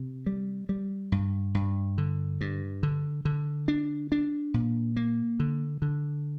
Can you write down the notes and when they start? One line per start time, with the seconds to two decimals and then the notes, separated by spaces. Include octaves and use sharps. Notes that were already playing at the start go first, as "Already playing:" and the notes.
Already playing: C3
0.26 G3
0.69 G3
1.12 G2
1.55 G2
1.98 D3
2.41 G2
2.83 D3
3.25 D3
3.68 D4
4.12 D4
4.54 A#2
4.96 A#3
5.40 D3
5.82 D3